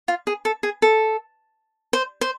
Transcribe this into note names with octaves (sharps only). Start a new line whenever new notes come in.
F4
G#4
A4
G#4
A4
C5
C5